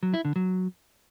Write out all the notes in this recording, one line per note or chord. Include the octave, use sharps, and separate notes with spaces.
F#3
E4
D3
F#3